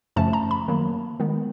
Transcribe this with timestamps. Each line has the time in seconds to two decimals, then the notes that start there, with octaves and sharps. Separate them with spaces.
0.16 F#2 C#3 F3 A3 C#4 A5
0.33 A#5
0.51 B5
0.68 D#3 F#3 A#3
1.20 D#3 G#3 B3